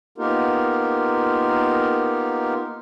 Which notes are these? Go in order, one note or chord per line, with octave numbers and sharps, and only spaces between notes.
A#3 B3 D#4 F4 G4 A#4